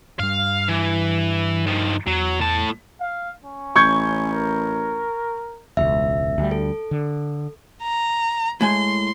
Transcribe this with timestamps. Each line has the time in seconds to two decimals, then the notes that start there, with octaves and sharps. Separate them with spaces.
0.19 G2 G3 F5
0.68 E3
1.66 D#3 F3
2.06 E2 F#3
2.41 A2 A5
3.01 F5
3.44 C#4
3.76 A1 C#6 G6 G#6
4.33 A#4
5.77 E1 C#2 E5
6.38 D2 G3
6.51 A4
6.91 D3
7.83 A#5
8.61 A2 G#3 G#5 C6